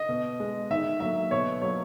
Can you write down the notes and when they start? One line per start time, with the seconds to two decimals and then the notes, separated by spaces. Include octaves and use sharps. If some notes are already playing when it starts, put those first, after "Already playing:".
Already playing: D#5
0.09 B2
0.40 G#3
0.71 D#3 E5
1.00 F#3 A#3 E5
1.31 B2 C#5
1.62 F#3 A#3 C#5